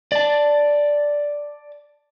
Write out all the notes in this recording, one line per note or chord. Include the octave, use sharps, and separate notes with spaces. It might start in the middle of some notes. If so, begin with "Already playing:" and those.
D5 A5